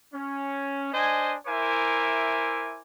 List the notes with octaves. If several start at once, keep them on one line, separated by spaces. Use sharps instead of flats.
C#4
D4 C5 D#5 G#5
E4 A#4 C5 E5 G#5 D6